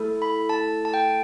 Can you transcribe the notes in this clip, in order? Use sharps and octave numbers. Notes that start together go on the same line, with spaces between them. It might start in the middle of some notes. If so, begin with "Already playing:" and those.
Already playing: A3 E4 A4
B5
A5
A5
G5